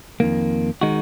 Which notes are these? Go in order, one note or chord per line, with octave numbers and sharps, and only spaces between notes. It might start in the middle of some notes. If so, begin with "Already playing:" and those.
F2 D#3 A#3
D#3 G#3 D#4 F#4